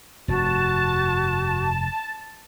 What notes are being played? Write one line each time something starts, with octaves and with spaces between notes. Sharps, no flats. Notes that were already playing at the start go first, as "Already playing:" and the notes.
F1 G2 F#4 A5